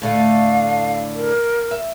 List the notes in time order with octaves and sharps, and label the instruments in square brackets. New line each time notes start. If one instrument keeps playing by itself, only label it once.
[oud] A2 D3 A3 [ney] F5
[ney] A#4
[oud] E5